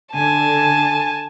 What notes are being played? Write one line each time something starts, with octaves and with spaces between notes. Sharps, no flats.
D3 G#5 A5